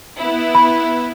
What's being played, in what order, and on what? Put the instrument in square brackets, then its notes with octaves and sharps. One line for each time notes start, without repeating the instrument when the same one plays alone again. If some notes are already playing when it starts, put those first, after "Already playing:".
[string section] B3 E4
[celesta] B5